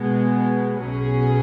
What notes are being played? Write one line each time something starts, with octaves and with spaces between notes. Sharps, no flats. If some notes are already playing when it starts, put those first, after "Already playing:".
Already playing: B2 G#3 B3
B1 B2 F#3 C#4 G#4